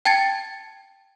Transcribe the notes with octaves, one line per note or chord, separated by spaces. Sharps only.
G5 A5 G#6 A6 C#7